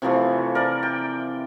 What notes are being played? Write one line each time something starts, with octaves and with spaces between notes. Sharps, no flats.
C3 E3 F3 A3
A#4 D5
G5